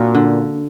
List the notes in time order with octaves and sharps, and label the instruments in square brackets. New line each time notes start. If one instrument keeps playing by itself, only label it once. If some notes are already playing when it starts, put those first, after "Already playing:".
Already playing: [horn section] A#2 [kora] A#3 C4 D4 F#4 A#4
[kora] D3